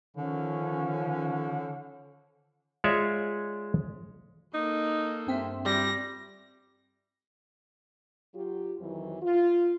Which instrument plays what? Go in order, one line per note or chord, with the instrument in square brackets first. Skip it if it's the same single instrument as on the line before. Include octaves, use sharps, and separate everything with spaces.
[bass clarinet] D3 [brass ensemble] D#3 F3 C#4
[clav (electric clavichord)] G#3 F4 C#5 D5 E5
[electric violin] A#3 A4 [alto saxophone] D#4
[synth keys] G2 C4 E5
[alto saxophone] G3 [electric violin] A#6
[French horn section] F#3 F4 G4
F2 D#3 E3 F#3
F4